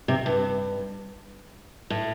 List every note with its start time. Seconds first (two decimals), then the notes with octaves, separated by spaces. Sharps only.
0.08 C3
0.26 G2
1.90 A2